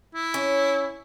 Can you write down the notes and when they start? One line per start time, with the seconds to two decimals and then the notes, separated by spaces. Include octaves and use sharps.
0.15 E4
0.34 C#4